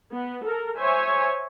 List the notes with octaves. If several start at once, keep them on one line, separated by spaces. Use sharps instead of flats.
B3
A4 A#4
C5 C#5 E5 G#5